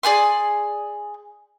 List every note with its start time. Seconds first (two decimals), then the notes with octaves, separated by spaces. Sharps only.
0.03 G#4 D5 G#5 C6